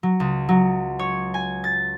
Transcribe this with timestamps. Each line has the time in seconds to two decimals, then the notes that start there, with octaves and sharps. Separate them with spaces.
0.03 F#3
0.20 C#2
0.49 F#3
0.99 C#5
1.34 G#5
1.64 A6